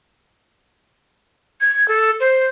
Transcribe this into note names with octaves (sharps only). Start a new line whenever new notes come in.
G#6
A4
C5